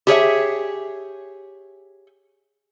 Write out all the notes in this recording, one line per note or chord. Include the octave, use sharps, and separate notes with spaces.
G4 G#4 C#5 E5